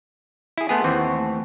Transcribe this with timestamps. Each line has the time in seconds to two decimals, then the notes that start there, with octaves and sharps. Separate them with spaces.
0.58 E4 G#4
0.69 A3 B3 G#4 F#5 A5 C6
0.84 D#2 E3 C4
0.95 F#5 A5 C#6
1.13 A3